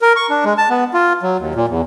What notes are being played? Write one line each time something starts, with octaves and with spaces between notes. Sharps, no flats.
A#4
C#6
D4
G#3
A5
B3
F4
F#3
D#2
A#2
E2